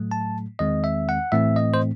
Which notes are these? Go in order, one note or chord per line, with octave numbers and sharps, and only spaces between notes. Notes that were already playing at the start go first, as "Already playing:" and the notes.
Already playing: A2 F#3 A3
A5
E2 D#3 G#3 C4 D#5
E5
F#5
A2 E3 A3 C4 E5
D#5
C5